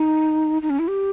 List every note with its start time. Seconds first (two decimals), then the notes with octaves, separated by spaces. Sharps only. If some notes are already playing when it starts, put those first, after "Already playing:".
Already playing: D#4
0.62 D#4
0.70 C#4
0.79 E4
0.88 G4